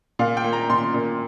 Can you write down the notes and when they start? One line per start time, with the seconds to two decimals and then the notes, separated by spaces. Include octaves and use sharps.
0.19 A#2 F5
0.37 G5
0.44 A#3
0.53 A#5
0.70 A#2 C6
0.94 A#2